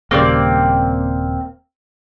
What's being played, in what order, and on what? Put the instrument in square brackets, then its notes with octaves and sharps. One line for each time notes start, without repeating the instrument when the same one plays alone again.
[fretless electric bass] D#1 C#3 G3 [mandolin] A#3 C4 D5